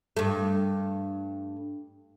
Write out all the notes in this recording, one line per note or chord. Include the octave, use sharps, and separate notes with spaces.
G2 A3